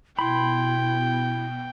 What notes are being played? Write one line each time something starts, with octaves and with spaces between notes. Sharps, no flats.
B2 E4 G5 B5 C6